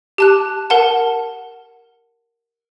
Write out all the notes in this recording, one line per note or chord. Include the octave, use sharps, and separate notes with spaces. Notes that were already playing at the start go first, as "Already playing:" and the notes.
G4 A5 F#6
A#4 F#5 A5